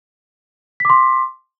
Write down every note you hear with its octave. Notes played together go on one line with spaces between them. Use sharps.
C6 D6 B6